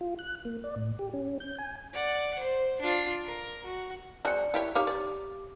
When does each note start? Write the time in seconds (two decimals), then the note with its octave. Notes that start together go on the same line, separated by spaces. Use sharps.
0.01 F4
0.19 F#6
0.45 A#3
0.64 D5
0.76 A2
0.99 G4
1.13 C#4
1.40 G6
1.58 G#5
1.93 D5 F#5
2.39 C5
2.81 D4 F4
3.24 A#4
3.65 F#4
4.25 G#3 C4 F#4 D5 F#6 C#7
4.54 E4 G4 C#5
4.75 D#4 G4 C#5 F5 D6
4.87 D5